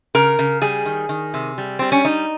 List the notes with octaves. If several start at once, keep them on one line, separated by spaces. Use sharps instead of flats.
C#3 A#4
C#3
G3 G#4
D#3
D#3
C3
G3
G3 C4
C#4
G3 D#4